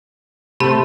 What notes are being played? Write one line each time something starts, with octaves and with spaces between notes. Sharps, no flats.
C3 A3 G4 B5